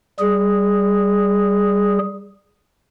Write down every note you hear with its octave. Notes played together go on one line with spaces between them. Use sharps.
G3 G#4